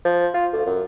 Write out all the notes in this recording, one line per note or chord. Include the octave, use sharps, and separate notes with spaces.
F3
F4
D2
F#2